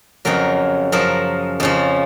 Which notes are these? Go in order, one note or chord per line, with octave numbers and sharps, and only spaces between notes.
F2 C#3 F#3 A#4
F#2 F3 A#4
F2 C#3 F3